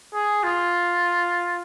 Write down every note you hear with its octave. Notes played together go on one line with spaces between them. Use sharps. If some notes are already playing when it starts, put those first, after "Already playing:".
G#4
F4